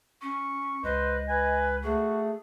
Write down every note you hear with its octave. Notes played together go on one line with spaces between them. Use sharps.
C#4 C#6
C#2 B4 C5 D#5
B4 G#5
A3 F#4 G#4